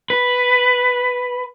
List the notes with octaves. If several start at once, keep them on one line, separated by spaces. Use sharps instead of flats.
B4